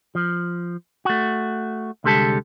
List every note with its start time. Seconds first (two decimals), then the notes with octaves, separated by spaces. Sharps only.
0.15 F3
1.05 A3 F#4
2.04 C2 D3 G#3 G4 A4 A5